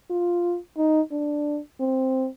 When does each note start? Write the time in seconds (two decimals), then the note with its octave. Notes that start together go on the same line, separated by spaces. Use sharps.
0.10 F4
0.77 D#4
1.11 D4
1.80 C4